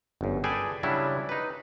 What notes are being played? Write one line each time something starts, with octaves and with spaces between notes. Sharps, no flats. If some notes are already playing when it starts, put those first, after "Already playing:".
G1 F#2
G#4 A4 B4 D5 G5 G#5
C#3 F#3 G3 C#4 D4 E4
D#4 B4